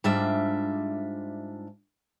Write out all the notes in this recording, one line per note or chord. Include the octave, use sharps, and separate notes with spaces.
G#2 G3 D4 F4 E5